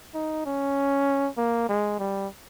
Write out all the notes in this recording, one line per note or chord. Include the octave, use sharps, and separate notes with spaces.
D#4
C#4
A#3
G#3
G3